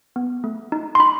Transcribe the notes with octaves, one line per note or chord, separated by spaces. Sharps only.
B3
A3
D#4
C6
D#4 B5